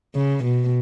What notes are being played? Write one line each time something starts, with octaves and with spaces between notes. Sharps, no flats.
C#3
B2